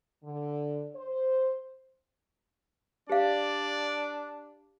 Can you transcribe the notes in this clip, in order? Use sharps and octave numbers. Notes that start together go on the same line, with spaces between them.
D3
C5
D4 G4 D5 F5